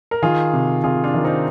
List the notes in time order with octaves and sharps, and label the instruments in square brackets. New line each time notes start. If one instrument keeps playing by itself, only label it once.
[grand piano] A#4
[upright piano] D#3 [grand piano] F4 G#4
[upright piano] C3
[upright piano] C3 [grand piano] F4 G#4
[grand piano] D4 F4
[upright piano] D#3
[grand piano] C4 D#4